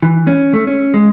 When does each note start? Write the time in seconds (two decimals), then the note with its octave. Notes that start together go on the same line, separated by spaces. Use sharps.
0.03 E3
0.27 C#4
0.53 A3
0.67 C#4
0.94 G#3